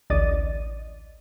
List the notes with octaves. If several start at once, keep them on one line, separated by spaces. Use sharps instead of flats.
A1 D2 D5 D#5 A6 D#7